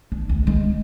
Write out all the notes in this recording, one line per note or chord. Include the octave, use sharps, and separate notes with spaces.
D4
D2
G#3